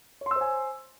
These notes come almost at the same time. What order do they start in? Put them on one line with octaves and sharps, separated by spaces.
C#5 C6 E6 C5 G#5